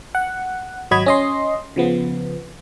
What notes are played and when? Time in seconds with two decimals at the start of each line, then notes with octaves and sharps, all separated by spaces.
0.15 F#5
0.91 G#1 F#3 F#4 D#5 B5 G#6
1.06 C#4 D#5 C6
1.76 C#3 F3 B3